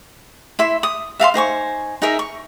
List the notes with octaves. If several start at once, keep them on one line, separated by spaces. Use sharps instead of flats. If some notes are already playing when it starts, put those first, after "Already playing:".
E4 E5 C6
D#6
E5 F5 A5 C6
D#4 C5 G#5 C#6
D#4 G#4 A#4 E5
C#6